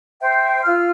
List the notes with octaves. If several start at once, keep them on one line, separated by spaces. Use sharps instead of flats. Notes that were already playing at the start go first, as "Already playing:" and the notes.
C5 E5 G5
F4 E6 F6